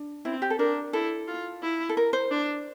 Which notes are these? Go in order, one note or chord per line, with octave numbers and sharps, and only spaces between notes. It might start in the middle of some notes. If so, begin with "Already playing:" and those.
Already playing: D4
C4 E4
G4
A4
D4 A#4
E4 A4
F4
E4
A4
A#4
C5
D4